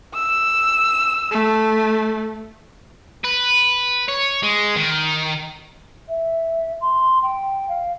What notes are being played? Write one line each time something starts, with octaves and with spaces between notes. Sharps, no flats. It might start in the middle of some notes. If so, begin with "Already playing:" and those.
E6
A3
B4
C#5
G#3
D#3
E5
C6
G5
F5